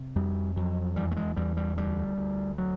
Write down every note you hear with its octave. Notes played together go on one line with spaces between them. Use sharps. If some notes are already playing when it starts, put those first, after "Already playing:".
Already playing: C3
F2 G3
F2 F#3
E2 G3
A3
G#3
E2 G3
G3
D2 G3
D2
F#3